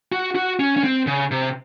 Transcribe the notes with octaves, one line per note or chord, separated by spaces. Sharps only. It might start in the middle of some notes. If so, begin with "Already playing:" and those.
F#4
F#4
C#4
C#4
C4
C#3
C3